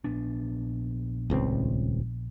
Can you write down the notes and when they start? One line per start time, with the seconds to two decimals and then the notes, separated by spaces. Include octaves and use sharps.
0.04 A#1 B3 D4
1.30 D#1 C#2 C4